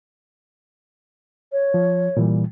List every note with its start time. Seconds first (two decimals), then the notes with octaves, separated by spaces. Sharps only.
1.52 C#5
1.74 F3
2.17 A#2 E3 G3